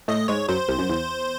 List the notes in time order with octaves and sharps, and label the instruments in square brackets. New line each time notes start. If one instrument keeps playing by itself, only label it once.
[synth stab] A2 A3 [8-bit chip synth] D#5
[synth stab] G#2 G#3 [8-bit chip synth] C#5
[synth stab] F#2 F#3 [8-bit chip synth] C5
[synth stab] C2 C3
F#2
E2